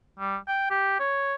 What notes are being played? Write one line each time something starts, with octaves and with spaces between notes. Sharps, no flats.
G3
G5
G4
C#5